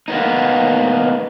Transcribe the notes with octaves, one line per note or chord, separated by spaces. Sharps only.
A#3 B3 D#4